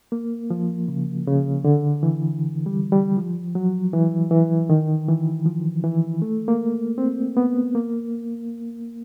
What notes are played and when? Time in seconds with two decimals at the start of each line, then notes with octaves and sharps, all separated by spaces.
0.12 A#3
0.50 F3
0.88 C#3
1.27 C#3
1.65 D3
2.03 E3
2.66 G3
2.92 G3
3.17 F3
3.55 F#3
3.94 E3
4.31 E3
4.70 D#3
5.08 E3
5.45 F3
5.84 E3
6.22 A3
6.48 A#3
6.98 C4
7.37 B3
7.75 A#3